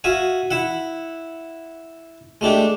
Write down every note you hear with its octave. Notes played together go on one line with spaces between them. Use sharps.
F#4 E5 F5 G#5
E4 E5 F#5
G#3 A3 D4 G4